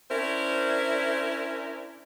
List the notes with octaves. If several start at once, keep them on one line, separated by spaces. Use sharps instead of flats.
C#4 D4 E4 A#4 C5